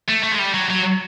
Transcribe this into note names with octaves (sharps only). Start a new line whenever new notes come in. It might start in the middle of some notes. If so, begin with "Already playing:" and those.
A3
A3
G#3
G3
F#3
F#3